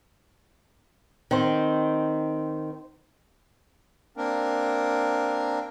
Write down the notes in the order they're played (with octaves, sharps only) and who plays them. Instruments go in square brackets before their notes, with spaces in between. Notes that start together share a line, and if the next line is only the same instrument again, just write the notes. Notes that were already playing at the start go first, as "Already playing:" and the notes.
[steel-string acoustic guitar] D#3 C4
[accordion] A#3 C4 D4 A#4